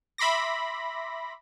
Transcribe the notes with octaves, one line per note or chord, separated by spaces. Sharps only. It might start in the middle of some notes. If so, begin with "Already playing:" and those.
E5 B5 C6 D6 A#6